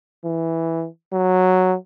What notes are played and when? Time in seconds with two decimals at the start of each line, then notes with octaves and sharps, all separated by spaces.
0.25 E3
1.13 F#3